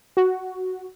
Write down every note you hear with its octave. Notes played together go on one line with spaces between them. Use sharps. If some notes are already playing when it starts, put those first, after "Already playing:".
F#4